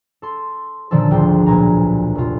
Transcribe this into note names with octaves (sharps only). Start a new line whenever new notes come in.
A4 C6
A#2 D3 D#3 F3 C#4 A4
G#1 D2 F4 G5 C7
B1 A#2 G#5 A#5
F1 F4